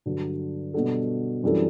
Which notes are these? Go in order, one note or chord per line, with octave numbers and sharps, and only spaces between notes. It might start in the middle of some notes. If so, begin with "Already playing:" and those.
G2 D3 F#3
B2 G3 D4 F#4 A4
F#2 E3 G3 D4 A4